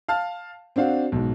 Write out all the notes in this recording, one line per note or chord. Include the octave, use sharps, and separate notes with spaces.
F5 A5 F6
C4 D4 F#4 F5
B1 G#2